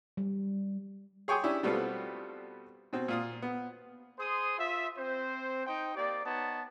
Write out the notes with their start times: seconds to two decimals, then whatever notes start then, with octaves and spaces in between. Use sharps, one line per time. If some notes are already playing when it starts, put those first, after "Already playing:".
0.17 G3
1.28 G#4 C#5 G5 G#5 C6 D6
1.43 C#4 D4 E4 G4
1.63 B2 G3 A3 B3 C4 F4
2.93 B2 C4
3.08 A#2 F4 D#6
3.42 B3
4.19 G#4 C5 C6 D#6
4.58 F4 E5
4.97 C4 C5
5.67 D#4 C5 G5
5.95 A#3 G4 D5
6.25 B3 D#4 C#5 A5